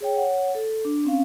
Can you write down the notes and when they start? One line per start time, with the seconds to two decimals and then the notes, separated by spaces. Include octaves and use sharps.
0.01 G#4 C#5 G5
0.17 C#5 F#5
0.55 A4
0.85 D4
1.05 C4 C#4 F5